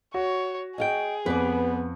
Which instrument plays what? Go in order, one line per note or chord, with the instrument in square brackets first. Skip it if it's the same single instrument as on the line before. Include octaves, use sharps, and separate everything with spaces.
[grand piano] F#4 [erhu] C#5
[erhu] G#4 [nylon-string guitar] D#5 F5 G5
[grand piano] F2 [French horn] B3 [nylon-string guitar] B4 D5